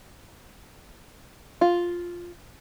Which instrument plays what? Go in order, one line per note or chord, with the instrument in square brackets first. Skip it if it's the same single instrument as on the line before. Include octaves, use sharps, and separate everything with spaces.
[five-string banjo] F4